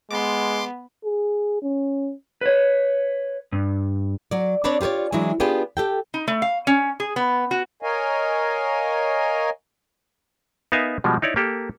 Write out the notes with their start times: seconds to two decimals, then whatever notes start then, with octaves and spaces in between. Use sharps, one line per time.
0.11 G#3 B3 C6 D6
1.04 G#4
1.62 C#4
2.41 B4 C#5
3.52 G2
4.31 F#3 D5
4.64 C4 D4 B4 C#5 D5
4.81 F4 G4 B4 C#5 D5
5.12 E3 F#3 G#3 D4 E4
5.40 B3 D4 F4 G4 G#4 B4
5.77 G4 A4 G5
6.14 D#4
6.28 A3
6.42 F5
6.67 C#4
7.00 G#4
7.16 B3
7.51 F#4
7.82 A#4 C#5 D#5 F5 G#5
10.72 B3 D#4 A#4 E5 F5 G#5
11.04 B2 F3 G3 G#3
11.22 D#4 E4 C#5 D5
11.36 A#3 G4 A4 A#4